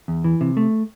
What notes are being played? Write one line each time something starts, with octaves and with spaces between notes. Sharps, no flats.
E2
E3
C3
A3